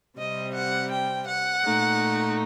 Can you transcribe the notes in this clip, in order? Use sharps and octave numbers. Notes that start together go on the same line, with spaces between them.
C3 G3 C4 D#5
F#5
G5
F#5
A#2 A3 D#4